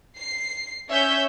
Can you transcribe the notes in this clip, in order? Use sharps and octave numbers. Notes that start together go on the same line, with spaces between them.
C7
C#4 E5 G6